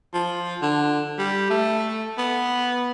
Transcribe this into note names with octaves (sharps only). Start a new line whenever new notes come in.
F3
D3
G3
A3
B3